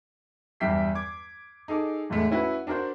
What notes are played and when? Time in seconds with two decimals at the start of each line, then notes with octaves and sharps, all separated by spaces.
0.60 E2 G2 E5 G5 B6 C7
0.95 D6 G#6
1.68 D#4 G#4 A4 D6
2.10 E2 A2 D3 G#3 A3
2.31 C#4 E4 F#4 B4
2.67 D4 F#4 A#4 C5